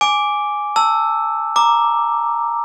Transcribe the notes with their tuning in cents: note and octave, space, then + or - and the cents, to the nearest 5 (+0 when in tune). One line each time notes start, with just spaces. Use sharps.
G#5 +0 D6 -5
A5 +25 E6 +0
A#5 +0 D6 +5